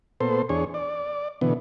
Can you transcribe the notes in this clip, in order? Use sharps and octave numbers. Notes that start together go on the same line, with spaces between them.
A#2 B3 A4 C5
E2 D4 G#4 C#5
D5
B2 D3 E3 B3